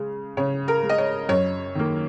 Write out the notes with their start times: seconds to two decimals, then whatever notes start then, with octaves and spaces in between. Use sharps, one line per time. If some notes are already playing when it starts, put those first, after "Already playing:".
Already playing: C#3 G#3
0.37 C#3 C#5
0.68 A#4
0.83 G#3
0.89 D#5
0.98 C#5
1.29 F#2 C#5
1.75 D#3 A#3